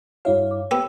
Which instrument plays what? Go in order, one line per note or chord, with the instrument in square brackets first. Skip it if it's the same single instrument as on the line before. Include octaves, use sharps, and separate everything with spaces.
[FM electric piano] G2 E4 F5 [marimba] F#4 C#5 E5
[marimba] D6
[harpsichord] B3 G4 [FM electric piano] E6